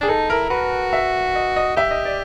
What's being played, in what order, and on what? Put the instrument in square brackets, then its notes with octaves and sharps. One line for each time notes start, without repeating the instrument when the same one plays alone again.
[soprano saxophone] D4 [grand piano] G#4
[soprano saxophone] D#4 [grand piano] A4
[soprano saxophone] E4 [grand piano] A#4
[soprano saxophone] F#4 [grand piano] B4
[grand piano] E5
D#5
D#5
[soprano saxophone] G4 [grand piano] E5
[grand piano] D#5
D5